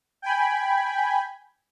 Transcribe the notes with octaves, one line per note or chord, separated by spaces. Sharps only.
G5 G#5 B5